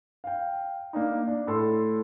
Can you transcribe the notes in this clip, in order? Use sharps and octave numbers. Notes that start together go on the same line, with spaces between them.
F5 G5
A#3 D4 D#4
D4
A2 A4 C6